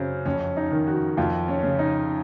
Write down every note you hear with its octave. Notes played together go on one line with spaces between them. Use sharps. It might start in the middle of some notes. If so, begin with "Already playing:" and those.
Already playing: F#2 C#3 C4
F2 C#4
D#4
D#3
F#4
F2 F4
C#4
C#3
D#4